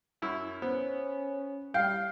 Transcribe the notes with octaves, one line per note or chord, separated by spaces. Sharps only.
F#2 E4
B3 C#4 C5
G3 F5 G5 G6 C7